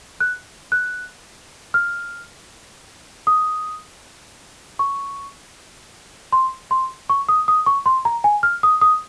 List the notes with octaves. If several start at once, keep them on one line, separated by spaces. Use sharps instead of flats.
F#6
F#6
F6
D#6
C#6
C6
C6
C#6
D#6
D#6
C#6
C6
A#5
G#5
F6
D#6
D#6